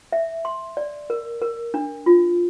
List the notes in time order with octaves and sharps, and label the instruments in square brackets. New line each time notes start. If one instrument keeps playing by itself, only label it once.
[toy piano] E5
C6
D5
A#4
A#4
D4
F4